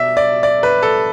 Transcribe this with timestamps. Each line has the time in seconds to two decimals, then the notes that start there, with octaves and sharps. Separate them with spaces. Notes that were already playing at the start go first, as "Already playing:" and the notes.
Already playing: B2 D5 E5
0.17 D5
0.43 D5
0.63 B4
0.83 A4